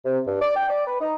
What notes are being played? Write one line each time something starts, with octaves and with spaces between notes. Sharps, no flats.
C3
G2
D5
G5
D5
B4
D#4